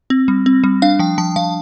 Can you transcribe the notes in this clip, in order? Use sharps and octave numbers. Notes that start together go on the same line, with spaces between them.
C4
G3
C4
G3
D4 F5
F3 G5
F3 A5
F3 F5